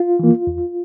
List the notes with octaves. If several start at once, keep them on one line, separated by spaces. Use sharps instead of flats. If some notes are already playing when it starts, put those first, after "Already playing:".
Already playing: F4
E3 A#3
E2